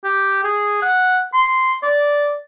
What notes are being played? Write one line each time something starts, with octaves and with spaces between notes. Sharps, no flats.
G4
G#4
F#5
C6
D5